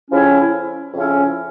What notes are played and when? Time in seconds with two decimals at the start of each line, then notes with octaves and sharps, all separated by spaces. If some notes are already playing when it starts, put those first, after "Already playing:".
0.10 F2 C#3 F3 C#4 E4
0.94 F2 C#3 F3 C#4 E4